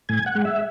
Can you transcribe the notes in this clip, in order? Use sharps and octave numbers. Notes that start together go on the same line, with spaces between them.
A2 G#5
F#5
G#3
E5